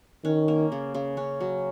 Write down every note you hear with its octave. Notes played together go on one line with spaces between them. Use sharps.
D#3 C#4
A#3
C#3
C#3
C#4
F#3